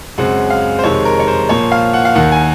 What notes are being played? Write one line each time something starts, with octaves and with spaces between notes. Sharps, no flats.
F#2 C#3 G#3 C4 F#5
F5
C5
F2 C3 D#3 G#3 C4 C#5
A#4
C#5
C5
A#2 F3 A#3 C#5
F5
F#5
F5
D#2 D#3 A#3 F#5
G#5